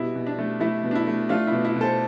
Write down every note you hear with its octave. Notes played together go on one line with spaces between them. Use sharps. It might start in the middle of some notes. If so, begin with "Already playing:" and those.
Already playing: B2 G3 E4
B2
D4
A3
A3 E4
B2
D4
E4
A3
A3 D4 F4
E4
B2
E4
B2
A4 C5